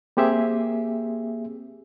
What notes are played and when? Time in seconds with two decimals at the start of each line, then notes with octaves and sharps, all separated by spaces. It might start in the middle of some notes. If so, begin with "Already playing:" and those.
0.17 A#3 C4 G4 G#4 E5